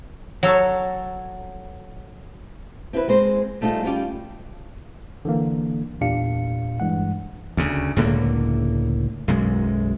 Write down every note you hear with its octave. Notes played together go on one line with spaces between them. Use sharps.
F#3 A4 C#5
C4 E4 A#4 B4
G#3 C4 C5
G3 A3 B3 D#4 F4 G#4
G3 B3 C#4 F4 G4
D3 E3 A#3
E2 A#2 D4 G4 F5 C#7
G2 E3 G#3 F#5
D2 C#3
C#2 A2 D3 A#3
B1 F#2 G#3